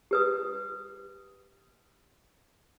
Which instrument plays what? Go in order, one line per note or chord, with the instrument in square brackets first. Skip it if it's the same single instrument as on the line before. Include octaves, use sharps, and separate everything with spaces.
[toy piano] G4 B4 D#6